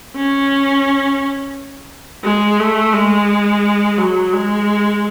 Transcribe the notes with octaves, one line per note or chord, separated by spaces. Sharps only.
C#4
G#3
A3
G#3
F#3
G#3